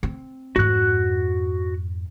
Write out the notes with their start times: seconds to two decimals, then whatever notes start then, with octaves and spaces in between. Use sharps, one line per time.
0.03 C4
0.56 F2 G#2 F#4 F#6